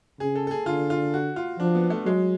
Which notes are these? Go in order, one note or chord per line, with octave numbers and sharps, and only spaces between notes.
C#3 G#4
A4
A4
G#4
D3 F4
F4
F#4
F4
F3 D4
B3
A3
F#3 G#3